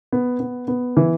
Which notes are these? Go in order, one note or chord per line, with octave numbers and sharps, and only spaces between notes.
B3
B3
B3
E3